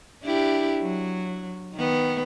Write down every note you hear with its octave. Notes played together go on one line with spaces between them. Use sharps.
D4 E4 G4
F#3
D#3 B3